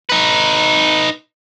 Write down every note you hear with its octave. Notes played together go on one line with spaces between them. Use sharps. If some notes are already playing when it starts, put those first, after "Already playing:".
D#4 B4